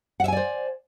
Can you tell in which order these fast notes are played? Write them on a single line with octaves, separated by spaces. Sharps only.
F#5 E5 G#5 D5 C5